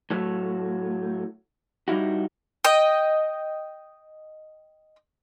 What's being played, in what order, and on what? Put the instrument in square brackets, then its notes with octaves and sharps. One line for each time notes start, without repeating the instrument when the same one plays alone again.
[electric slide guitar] A2 F#3 A3
G3 D#4 E4 F#4
[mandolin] D#5 G5